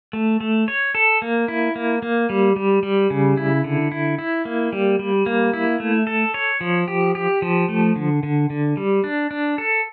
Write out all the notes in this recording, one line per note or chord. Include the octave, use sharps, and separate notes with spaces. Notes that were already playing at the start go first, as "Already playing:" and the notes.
A3
A3
C#5
A4
A#3
E4
A#3
A#3
G3
G3
G3
C#3
E4
D3
E4
E4
A#3
G3
G3
A#3
E4
A3
A4
C#5
F3
G4
G4
F3
A3
D3
D3
D3
G3
D4
D4
A4